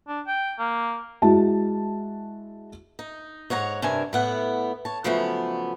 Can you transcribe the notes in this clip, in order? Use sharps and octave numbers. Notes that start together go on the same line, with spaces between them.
D4
G5
A#3
G#3 E4 F#4 A5
D#4
G#2 C#5 F#5 A#5
G2 C3 D4 A#4 G#5
A2 B3 F#5
C#5 A5
C#3 F3 F#3 A3 B3